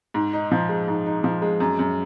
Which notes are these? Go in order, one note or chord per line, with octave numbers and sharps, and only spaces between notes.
G#2
D#4
F3
G#3
G#2
D#4
F3
G#3
F#2
F#2